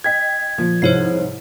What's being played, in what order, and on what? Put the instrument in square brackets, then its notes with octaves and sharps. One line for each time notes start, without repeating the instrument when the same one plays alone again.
[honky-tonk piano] D#5 G5 B6 [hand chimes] G#6
[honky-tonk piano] A#2 [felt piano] F3
[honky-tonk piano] C2 G#2 E4 [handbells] C5 C#5 C7